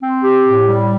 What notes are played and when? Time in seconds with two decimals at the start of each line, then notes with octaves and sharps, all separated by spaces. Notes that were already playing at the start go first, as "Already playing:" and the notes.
0.02 C4
0.24 G4
0.44 A2
0.66 G3